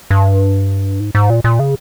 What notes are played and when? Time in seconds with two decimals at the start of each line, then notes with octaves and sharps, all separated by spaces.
0.11 G2
1.00 G#2
1.15 G#2
1.30 A#2
1.44 A#2
1.59 C#3